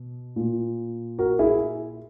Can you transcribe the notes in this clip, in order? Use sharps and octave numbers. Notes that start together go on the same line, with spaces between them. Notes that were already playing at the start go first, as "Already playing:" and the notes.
Already playing: B2
A#2
F#4 A#4
E4 G#4